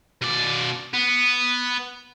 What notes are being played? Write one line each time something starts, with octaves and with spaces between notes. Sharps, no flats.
B2 D5
B3